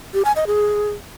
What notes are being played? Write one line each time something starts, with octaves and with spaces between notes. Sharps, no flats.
G4
G#5
D#5
G#4